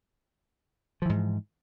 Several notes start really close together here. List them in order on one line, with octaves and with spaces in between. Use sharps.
F3 E3 G#2